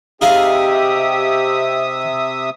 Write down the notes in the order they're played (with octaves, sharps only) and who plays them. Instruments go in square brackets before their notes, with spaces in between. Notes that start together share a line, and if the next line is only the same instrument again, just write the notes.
[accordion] C3 E5 D#6 [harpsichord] D#4 G#4 F5 [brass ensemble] G4